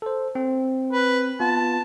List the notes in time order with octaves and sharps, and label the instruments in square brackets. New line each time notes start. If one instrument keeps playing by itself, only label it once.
[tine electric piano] A4 C5
C4
[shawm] B4
[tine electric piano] B3 F4 [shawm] A5